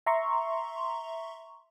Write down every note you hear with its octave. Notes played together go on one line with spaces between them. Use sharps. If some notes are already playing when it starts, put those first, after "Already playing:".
E5 A#5 C6 C#6